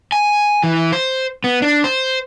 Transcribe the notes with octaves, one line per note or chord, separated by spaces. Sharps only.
G#5
E3
C5
B3
D4
C5